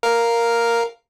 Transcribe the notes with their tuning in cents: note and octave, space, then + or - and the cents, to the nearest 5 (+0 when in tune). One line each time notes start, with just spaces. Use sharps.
A#4 +0 F5 +0